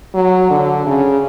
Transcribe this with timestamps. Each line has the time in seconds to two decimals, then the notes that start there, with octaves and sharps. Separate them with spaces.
0.14 F#3
0.50 D3
0.86 C#3